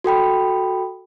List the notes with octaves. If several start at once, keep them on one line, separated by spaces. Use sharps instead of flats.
F#4 A4 G5 B5